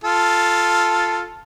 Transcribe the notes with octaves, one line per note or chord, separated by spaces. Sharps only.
F4 A4